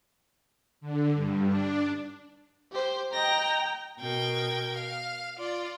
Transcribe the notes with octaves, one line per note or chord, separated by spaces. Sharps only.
D3
G2
D4
G4 C5
D#5 G5 A#5 A#6
B2 A#4 G5 G#6
F5
F4 D5